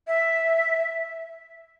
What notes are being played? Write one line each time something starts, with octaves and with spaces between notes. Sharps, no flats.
E5